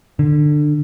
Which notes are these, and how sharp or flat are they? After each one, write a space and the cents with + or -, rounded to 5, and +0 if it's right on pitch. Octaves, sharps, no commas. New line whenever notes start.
D3 +20